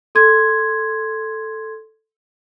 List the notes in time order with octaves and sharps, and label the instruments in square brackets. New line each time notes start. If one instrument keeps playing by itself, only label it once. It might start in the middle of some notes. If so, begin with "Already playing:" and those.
[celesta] A4 C6 G#6